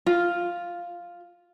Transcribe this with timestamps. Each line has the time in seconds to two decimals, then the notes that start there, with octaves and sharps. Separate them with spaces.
0.06 F4